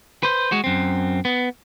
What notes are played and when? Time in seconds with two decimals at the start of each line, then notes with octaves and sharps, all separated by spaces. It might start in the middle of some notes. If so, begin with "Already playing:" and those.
0.23 B4 C5
0.52 G#3 F#4
0.64 F#2 C4
1.25 B3